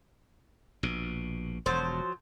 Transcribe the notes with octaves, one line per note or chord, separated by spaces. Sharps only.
A#1 B2
E1 F3 F#3 C5